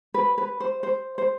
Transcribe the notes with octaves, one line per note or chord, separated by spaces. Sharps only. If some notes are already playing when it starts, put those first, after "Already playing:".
B4
B4
C5
C5
C5